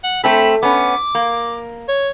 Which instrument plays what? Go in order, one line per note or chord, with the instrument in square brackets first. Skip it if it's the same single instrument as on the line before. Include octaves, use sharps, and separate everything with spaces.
[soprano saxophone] F#5
[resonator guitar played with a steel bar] A3 C4 A4 [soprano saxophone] B5
[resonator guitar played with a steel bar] B3 C#4 [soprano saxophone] D6
[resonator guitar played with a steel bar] A#3
[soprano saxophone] C#5